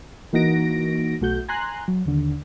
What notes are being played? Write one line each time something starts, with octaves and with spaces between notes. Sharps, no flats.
E3 A#3 D#4 F#4 A#6 D7
B1 A3 F#4 G6
G#5 A#5 C6 F#6
F#3
D#2 D3